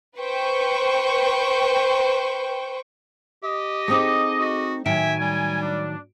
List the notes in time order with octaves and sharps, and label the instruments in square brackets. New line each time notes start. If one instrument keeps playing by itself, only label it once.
[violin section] B4 C5 G5 C#6
[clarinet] G4 [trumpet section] D#5
[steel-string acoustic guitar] A3 C4 D#4 [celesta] G#4 D6 D#6
[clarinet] F#4
[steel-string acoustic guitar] A2 D#3 F#3 [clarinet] E5 [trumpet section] G#5 [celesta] D7
[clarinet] G3
[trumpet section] D4